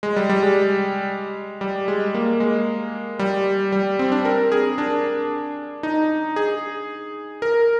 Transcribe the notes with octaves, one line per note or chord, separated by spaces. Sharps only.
G#3
G3
G3
G#3
G3
G#3
A#3
G#3
G3
G3
C4
D4
A#4
G#4
D4
D#4
G#4
A#4